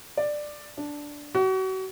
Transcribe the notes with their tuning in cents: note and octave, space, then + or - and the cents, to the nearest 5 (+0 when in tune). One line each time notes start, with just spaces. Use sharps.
D5 +10
D4 -5
F#4 +35